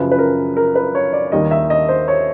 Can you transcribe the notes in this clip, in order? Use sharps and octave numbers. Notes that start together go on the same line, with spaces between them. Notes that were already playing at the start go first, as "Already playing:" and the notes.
Already playing: F#2 C#3 F3 B4
B4
A#4
A#4
B4
C#5
D5
D#2 D#3 G3 D#5
E5
D#5
C5
C#5